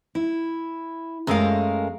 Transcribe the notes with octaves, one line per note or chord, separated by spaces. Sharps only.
E4
F#2 G#3 A3 G#4 A#4 F5